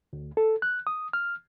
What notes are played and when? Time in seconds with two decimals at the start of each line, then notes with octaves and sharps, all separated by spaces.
0.13 D2
0.37 A4
0.62 F#6
0.87 D#6
1.13 F6